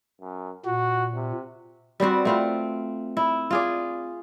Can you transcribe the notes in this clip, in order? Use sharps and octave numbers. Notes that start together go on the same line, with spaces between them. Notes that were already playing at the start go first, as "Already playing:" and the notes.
F#2
A#2 F#4
C3
G3 B3 C4 F#4
A3 C4 F4
E4
F4 G#4 D5